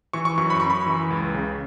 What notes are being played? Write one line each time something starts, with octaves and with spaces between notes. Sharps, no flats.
E3 C#6
C#6
F#2 C#6
B5
F#2 C#6
B5
E3
C#2
C#3